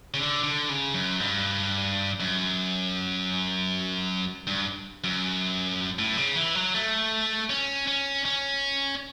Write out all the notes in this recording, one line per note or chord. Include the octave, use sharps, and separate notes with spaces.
C#3
D3
D3
C#3
F#2
G2
F#2
G2
F#2
A2
C#3
E3
F#3
A3
C#4
C#4
C#4